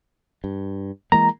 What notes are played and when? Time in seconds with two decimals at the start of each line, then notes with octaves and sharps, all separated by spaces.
0.44 G2
1.12 E3 G#3 A#3 A#5